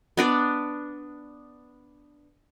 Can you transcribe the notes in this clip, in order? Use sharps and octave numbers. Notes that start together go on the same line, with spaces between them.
B3 D4 D5